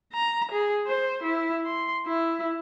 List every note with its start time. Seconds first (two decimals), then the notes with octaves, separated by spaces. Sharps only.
0.13 A#5
0.52 G#4
0.87 C5
1.23 E4
1.66 C6
2.06 E4